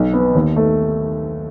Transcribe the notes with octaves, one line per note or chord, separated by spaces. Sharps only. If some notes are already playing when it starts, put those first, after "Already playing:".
Already playing: B1
B3
D#2
A3